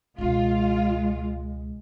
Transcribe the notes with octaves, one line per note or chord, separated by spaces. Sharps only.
C#2 B2 G#3 F4